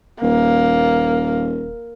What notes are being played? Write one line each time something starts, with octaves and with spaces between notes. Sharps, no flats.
D#1 A#3